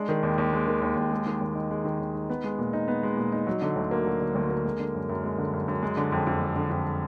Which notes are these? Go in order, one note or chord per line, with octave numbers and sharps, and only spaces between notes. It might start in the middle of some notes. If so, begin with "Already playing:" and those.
Already playing: G#3 D4
D#3
D#2
D#2
G#3
D#3
D#2
D#2
G#3
D#3
D#2
D#4
G#3
D#3
D#2
D#4
B3
G#3
A#2
D#4
B3
G#3
A#2
D#4
F#3
D3
D2
A#3
F#3
D3
D2
A#3
G#3
D3
F#2
F#2
G#3
D3
F#2
F#2
G#3
D3
F2
F2
G#3
D3
F2